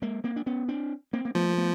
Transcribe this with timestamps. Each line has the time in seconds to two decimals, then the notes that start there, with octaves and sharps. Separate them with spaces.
0.02 G#3 A#3
0.24 A#3 C4
0.36 D4
0.46 B3 C#4
0.68 C4 D4
1.13 A#3 C4
1.25 A#3
1.35 F3 A3 B3
1.50 A#3
1.58 A3 B3